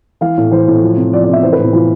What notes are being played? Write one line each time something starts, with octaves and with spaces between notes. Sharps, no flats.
E3 F5
A2
E3 C5
A2
F3
C3
F3 D5
D5
C3 E5
E3 C5
B4
A2
E4
E3 F4